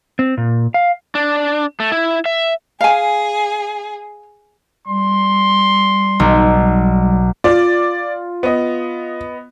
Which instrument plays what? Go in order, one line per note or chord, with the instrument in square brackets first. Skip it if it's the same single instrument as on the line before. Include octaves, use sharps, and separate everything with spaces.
[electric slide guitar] C4
A#2
F5
D4
A3
E4
E5
[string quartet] G#4 [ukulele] F5 G#5
[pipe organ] G3 [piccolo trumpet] C6
[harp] B1
[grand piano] F4 [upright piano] D5
[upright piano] B3 D#5